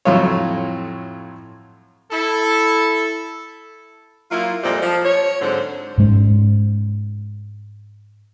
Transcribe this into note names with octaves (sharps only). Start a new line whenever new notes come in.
F2 A2 F#3 F4 C#5
E4 A4
F#3 A#3 E4 F4
F2 A#2 G3 C4 A4 D#5
F3
C#5
G#2 D3 F#3 C4 C5
G#2 G#3 C#4